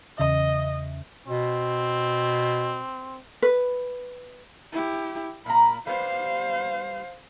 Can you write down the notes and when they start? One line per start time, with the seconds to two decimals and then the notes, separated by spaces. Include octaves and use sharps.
0.18 E2 C#3 D#5 E5
1.27 B2 C4
3.42 B4
4.73 E4 G4
5.46 A#2 A#3 A#5 B5
5.87 G3 B3 C5 F5